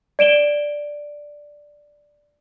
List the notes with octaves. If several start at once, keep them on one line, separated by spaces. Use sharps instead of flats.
D5 D7 E7 G7